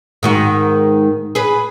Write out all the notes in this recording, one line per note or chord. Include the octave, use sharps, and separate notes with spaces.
G#2 D#3 F#4
G#4 B4